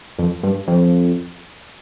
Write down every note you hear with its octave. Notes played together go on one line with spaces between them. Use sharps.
F2
G2
F2